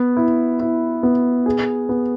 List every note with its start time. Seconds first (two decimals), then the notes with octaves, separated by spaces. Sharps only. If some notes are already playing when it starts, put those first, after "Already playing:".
Already playing: B3
0.17 E4
0.60 E4
1.03 B3
1.46 G#4
1.89 B3